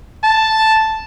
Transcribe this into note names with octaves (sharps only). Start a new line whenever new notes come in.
A5